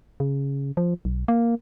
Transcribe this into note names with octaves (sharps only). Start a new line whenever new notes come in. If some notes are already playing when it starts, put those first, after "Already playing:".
C#3
F3
B1
A#3